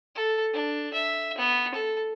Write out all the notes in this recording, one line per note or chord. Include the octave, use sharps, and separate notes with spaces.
A4
D4
E5
B3
A4